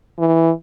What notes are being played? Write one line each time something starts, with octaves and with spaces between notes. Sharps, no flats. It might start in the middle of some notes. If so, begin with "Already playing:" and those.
E3